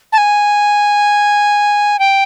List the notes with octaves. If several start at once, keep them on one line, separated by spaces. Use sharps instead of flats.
A5
G#5
G5